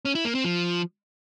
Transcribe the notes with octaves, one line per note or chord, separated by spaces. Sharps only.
C#4
E4
A#3
C4
F3